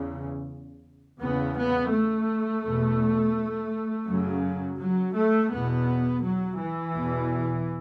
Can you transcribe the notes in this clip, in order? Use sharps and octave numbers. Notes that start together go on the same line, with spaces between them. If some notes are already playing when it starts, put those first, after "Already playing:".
Already playing: E2 C#3
E2 C#3 B3
B3
A3
E2 B2
F#2 C#3 F#3
F#3
A3
E2 B2 B3
F#3
E3
E2 B2